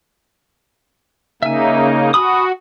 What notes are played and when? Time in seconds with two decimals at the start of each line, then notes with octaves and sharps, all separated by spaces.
1.43 C#3 A#3 D#4 E5 G#5
2.14 F#4 G#5 B5 D#6